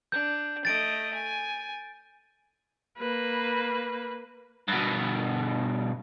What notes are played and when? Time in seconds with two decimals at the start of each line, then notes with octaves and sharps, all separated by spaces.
0.12 D4 G6
0.65 A3 D#5 A6 D7
1.14 G#5
2.98 A#3 B4
4.68 G2 B2